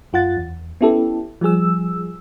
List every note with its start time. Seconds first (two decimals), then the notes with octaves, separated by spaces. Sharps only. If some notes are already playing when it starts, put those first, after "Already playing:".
0.13 F#2 F4 F#5 A6
0.37 E2
0.81 B3 C#4 E4 G4 A4
1.41 F3 G3 G#4 E6